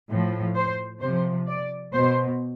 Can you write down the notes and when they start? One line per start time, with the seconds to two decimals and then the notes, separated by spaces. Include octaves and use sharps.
0.10 A2 F3
0.55 C5
1.01 C3 F3 C5
1.47 D5
1.93 B2 C5